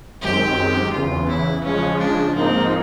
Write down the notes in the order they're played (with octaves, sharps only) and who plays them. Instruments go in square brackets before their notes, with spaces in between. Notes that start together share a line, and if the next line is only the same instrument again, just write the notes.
[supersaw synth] F#2 D#3 G#3 C4 [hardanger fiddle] G4
[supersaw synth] E2 C#3 E3 [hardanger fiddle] F4
[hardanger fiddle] E4
[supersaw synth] C#3 F3 G#3 [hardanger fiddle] C#4
[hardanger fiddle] D4
[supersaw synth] G#2 F3 A#3 D#4 [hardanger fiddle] C4